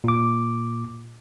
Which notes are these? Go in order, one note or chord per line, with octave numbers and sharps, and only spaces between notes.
A#2 D6